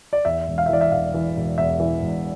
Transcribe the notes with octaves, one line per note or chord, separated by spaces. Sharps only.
D5
E2 E5
E1
F5
E5
E3 D5
E5
E1 F5
E3
E1
E2 E5
E3
E1